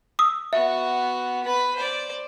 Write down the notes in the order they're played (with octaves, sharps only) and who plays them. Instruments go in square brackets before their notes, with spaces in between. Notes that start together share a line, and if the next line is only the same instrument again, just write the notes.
[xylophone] D#6 E6
[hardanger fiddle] B3 F#4 [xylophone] E5
[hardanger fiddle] B4 B5
C5 D5